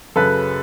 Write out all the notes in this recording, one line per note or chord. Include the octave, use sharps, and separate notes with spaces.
F#2 C#3 F#3 A4 B4